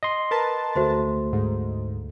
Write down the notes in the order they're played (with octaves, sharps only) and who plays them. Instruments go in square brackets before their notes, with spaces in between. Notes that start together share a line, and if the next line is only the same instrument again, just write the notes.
[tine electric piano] D#5 C6
[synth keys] A#4 B4 A5
[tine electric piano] D2 A3 [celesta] F#4 C5 C6
[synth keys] G#2